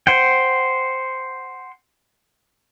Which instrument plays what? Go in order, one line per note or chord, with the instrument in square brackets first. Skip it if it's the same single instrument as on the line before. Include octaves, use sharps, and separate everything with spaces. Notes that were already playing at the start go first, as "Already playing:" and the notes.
[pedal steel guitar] C5 F#5 G5